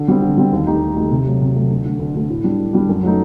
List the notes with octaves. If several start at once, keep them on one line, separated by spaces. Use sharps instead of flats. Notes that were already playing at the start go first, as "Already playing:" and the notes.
Already playing: D3
G3 C4
D3
G3 C4
D#2
D#3 A3 D#4 G4
D#2
D#3 A3 D#4 G4
C3
F#3 A3
C3
F#3 A3
D2
D3 A3
D2
D3 A3
A2
G3 D4
A2
G3 D4
F#2
F#3 A3 D#4